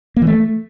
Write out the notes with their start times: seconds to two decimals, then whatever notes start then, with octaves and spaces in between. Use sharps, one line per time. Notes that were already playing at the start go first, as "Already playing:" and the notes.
0.17 A#3
0.22 E3
0.27 A3